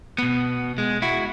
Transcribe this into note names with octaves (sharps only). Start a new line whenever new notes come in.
B2 B3
G#3
E4 F#4